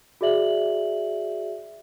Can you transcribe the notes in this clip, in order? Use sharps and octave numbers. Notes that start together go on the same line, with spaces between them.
F#4 G#4 D5 E5 F#7